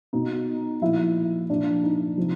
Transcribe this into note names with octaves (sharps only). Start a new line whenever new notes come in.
B2 D#4
A#2 F3 E4
A#2 F3 D4
D#4
C3 F3